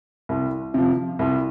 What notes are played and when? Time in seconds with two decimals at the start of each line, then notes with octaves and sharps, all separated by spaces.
0.29 C2
0.74 C3 F3
1.19 C2